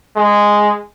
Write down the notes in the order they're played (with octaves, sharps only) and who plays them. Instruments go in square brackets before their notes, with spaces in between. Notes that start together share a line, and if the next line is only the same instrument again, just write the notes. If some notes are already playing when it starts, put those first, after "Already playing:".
[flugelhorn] G#3